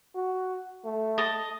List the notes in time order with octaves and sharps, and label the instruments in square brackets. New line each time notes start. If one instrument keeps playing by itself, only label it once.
[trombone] F#4
A3
[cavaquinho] D#5 A5